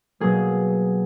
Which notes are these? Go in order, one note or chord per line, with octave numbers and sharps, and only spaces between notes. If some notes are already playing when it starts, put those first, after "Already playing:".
B2 F#3 A#3 G#4